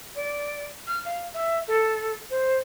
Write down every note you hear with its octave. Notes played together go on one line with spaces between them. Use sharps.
D5
F6
F5
E5
A4
C5